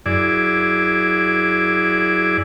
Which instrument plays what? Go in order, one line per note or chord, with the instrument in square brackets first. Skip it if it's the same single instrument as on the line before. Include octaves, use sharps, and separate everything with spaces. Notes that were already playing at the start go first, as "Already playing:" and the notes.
[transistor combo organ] F#2 E4 G#4 D5